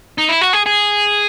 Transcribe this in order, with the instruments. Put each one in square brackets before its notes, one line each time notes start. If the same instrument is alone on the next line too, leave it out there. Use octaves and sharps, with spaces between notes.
[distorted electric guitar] D#4
E4
F#4
G#4
G#4